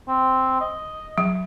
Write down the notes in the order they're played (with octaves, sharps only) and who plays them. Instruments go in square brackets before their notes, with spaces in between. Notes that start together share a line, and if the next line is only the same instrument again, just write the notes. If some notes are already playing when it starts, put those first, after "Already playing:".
[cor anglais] C4
D#5
[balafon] F#3